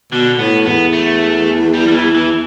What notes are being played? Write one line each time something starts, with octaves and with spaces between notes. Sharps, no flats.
B2 D3
A2 B3
E2 B3
A3
G3
G3
E3
E3